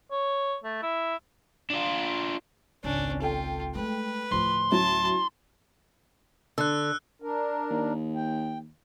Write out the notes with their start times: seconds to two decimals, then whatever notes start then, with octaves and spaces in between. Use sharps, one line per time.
0.11 C#5
0.64 A3
0.83 E4
1.70 D4 F4
2.84 G#1 C#2 C#4 D4
3.22 F4 A4 G5
3.75 G#3 A3 B4
4.32 D2 A2 F3 C6
4.71 F#3 C#4 E4 A5
6.58 D3 E6 F#6
7.22 D4 A#4
7.70 D#2
8.16 G5